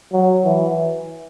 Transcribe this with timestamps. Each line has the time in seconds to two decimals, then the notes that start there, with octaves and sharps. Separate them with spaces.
0.12 F#3
0.44 E3